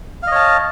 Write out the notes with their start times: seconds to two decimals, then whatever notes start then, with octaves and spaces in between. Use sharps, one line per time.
0.23 F5
0.27 D#5
0.32 C#5
0.36 A5